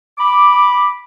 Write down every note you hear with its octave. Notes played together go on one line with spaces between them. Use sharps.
B5 D6